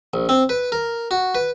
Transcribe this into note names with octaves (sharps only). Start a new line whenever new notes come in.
A#1
C4
B4
A#4
F#4
B4